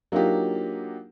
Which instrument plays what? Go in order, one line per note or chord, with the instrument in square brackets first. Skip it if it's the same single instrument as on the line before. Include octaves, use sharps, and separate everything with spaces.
[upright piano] F#3 A#3 D4 D#4 F4 G4